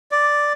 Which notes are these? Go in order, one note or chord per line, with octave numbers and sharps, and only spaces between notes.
D5